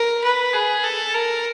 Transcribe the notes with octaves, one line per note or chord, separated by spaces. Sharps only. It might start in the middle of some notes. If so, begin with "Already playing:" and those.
Already playing: A#4
B4
G#4
A4
A#4